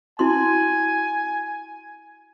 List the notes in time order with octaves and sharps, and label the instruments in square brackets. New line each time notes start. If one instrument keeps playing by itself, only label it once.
[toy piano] E4 F#4 C6 [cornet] G#5